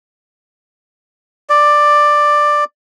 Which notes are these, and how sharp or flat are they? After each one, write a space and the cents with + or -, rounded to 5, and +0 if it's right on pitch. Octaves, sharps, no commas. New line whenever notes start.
D5 +10